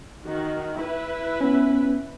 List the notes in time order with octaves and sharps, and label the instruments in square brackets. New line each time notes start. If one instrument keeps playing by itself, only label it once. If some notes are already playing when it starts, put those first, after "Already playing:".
[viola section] D#3 F#4
E4 B4
[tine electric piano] B3 C#4